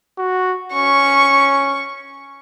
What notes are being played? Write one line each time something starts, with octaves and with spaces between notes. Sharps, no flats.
F#4
C#4 C#6